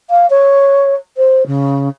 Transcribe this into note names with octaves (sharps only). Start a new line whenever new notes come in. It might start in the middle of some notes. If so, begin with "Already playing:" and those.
F5
C#5
C5
C#3